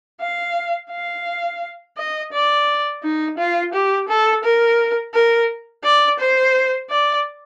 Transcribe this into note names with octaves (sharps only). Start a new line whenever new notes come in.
F5
F5
D#5
D5
D#4
F4
G4
A4
A#4
A#4
D5
C5
D5